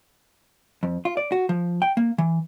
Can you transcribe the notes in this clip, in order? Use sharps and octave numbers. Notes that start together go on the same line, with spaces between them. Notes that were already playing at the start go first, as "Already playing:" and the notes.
F2
F4
D5
F#4
F3
G5
A#3
E3